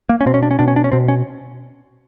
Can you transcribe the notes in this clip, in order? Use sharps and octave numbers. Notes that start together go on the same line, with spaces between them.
A#3
C#4
B2 C4
C#4
D4
C#4
B2 D4
C#4
D4
C#4
B2 C4
C#4